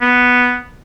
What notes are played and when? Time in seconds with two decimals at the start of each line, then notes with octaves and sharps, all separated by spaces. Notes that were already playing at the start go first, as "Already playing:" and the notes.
0.01 B3